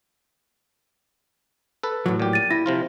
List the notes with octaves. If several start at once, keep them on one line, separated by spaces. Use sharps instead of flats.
A4 B4
A2 F#3
A#2 G4
A6 D#7
E4 A#6
C3 F3 F4